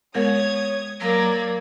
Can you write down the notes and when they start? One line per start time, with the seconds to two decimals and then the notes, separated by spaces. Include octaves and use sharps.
0.15 G#3 B3 A#4 C#5 D#6 G#6
1.00 F#3 A#3 D5 G#6 A#6